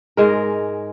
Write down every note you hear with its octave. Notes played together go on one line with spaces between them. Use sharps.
G#2 G#3 A#4